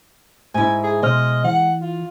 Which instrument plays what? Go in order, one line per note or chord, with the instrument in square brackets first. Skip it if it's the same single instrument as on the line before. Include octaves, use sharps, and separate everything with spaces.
[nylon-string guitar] G#2 E4 [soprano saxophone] G#5
[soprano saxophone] G#4
[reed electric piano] B2 C5 F6 [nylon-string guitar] G#3 [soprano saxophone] D#5
[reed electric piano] E3 [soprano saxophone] F#5
[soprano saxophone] F4